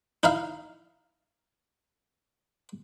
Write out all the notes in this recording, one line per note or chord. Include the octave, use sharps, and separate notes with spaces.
D#4 E4 E5 F5